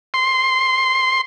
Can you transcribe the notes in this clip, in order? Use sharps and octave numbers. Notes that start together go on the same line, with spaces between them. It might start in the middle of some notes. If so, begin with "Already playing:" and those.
C6